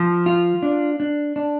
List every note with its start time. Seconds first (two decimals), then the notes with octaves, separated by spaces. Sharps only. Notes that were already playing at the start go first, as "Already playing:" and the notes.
Already playing: F3
0.26 F4
0.63 D4
1.00 D4
1.36 D4